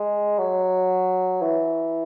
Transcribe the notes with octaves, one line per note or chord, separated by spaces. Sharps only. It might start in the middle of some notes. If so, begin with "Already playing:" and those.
Already playing: G#3
F#3
E3